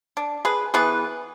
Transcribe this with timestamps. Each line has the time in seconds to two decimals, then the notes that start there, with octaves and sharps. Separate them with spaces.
0.17 D4
0.45 G#4 B4
0.74 E3 B3 G#4 B4